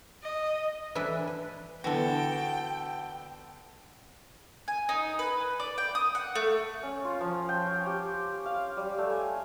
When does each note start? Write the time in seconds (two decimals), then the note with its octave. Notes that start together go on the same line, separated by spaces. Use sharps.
0.23 D#5
0.95 E3 D4 E4 A4 B4
1.27 B4
1.84 D3 E3 B3 F#4 A4 G5
4.68 G#5
4.89 D#4
5.19 B4
5.60 D5
5.78 G5
5.95 D#6
6.15 F#5
6.35 A3
6.83 C#4
7.05 F4
7.21 F3
7.49 G5
7.67 C#5
7.86 G4
8.46 F5
8.77 G3
8.98 A3
9.10 G#5